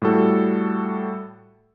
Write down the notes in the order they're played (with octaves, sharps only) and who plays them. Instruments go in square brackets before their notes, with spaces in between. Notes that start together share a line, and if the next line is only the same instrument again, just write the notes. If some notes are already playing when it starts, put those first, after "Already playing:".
[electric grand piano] A2 G3 F#4 A4